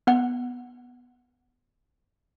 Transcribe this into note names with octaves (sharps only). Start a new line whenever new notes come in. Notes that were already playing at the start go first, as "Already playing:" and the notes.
B3 F#5